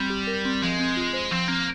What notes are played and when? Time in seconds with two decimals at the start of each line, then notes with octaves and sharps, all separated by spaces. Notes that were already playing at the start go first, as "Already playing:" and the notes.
Already playing: G3 C4
0.10 G4
0.27 A#4
0.45 C4
0.63 F3 G#3
0.79 C4
0.97 F4
1.13 C5
1.31 F3 C4
1.48 A#3 C4